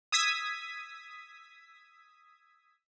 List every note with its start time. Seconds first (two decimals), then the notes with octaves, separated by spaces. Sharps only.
0.12 D#6 E6 G#6 B6